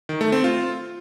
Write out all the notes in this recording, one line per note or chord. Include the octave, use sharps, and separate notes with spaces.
D#3
A3
C4
F4